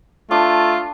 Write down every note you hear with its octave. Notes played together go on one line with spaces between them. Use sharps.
A3 D4 F4